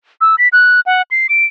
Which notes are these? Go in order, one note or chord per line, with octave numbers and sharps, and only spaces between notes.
E6
B6
F#6
F#5
C7
D7